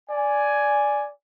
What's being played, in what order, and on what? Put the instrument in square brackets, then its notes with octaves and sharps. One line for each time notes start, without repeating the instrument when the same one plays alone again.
[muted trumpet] D5 [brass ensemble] G#5